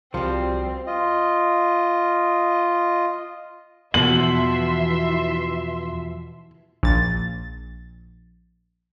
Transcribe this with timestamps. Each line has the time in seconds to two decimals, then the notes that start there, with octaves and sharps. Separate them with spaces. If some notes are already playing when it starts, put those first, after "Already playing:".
0.14 C2 F3 G3 C4 F#4 C6
0.87 F4 D#5
3.94 E2 B2 E3 F3 E5 C6 F#7
6.83 A#1 A6